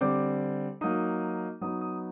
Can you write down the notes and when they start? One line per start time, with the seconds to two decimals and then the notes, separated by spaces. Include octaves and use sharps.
0.01 D3 G3 C4 D6
0.81 F#3 A#3 D#4 D#6
1.61 F#3 B3 D#4 D#6
1.81 D#6